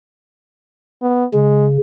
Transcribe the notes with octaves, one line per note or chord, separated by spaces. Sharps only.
B3
C#3 G#3